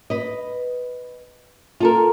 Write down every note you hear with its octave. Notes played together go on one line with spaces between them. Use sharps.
B4 D#5
F4 A4 A#4